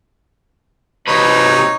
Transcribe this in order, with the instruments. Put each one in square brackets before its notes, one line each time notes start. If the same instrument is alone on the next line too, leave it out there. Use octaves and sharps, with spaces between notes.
[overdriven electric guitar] C3 B4 [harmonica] D#4 C#5